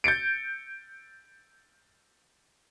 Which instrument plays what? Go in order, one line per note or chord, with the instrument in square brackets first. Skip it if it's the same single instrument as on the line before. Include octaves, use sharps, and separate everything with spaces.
[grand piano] G6 A6 C#7 D7